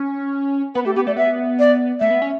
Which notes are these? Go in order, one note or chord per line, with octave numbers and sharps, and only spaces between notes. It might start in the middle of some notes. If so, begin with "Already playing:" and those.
Already playing: C#4
B3 B4
A3 G4
B3 G4
A3 D5
B3 E5
D5
A3 E5
B3
C#4